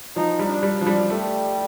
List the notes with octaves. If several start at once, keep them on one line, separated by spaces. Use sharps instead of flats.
F3 D#4
G3
D4
G3
F3 D4
G3
G3 A3